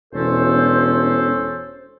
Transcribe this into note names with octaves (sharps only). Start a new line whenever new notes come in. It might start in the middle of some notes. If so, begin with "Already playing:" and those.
E1 C#4 A4 C5